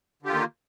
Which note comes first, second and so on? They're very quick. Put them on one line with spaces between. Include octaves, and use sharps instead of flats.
D3 G4 F4 D#3 A#3